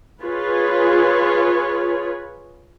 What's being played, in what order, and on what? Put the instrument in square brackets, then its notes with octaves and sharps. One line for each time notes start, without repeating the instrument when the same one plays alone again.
[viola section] F4 G#4 B4 C#5